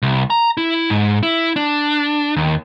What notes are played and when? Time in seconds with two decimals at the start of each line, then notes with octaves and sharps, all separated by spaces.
0.02 C2
0.30 A#5
0.57 E4
0.90 G#2
1.23 E4
1.56 D4
2.36 D#2